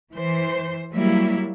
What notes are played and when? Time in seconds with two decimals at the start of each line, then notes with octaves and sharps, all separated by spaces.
0.14 E3 C5
0.92 F#3 G3 A#3 E4